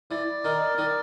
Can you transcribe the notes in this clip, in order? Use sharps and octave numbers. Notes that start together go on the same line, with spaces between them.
E3 D5
D#3 A#4
D#3 D5